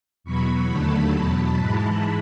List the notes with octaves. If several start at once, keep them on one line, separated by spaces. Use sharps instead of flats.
E2 B2 F#3 B5 C#6
D#2 D3 F#3 A3 A5 B5
E2 B2 F#3
G#2 E3 G#3